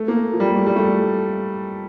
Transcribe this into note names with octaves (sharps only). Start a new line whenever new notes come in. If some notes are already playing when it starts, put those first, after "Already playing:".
Already playing: A3
A#3
F3
G3
A3
G3
A3